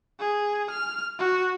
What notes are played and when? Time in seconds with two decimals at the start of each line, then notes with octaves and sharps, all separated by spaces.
0.20 G#4
0.70 F6
1.19 F#4